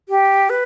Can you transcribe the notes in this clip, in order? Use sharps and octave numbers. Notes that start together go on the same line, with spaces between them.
G4
B4